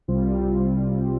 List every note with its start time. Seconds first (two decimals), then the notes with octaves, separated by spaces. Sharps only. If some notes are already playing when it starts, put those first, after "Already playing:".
0.08 C2 C3 G3 C4 F4